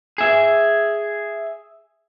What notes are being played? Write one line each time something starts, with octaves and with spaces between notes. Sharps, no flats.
G#4 E5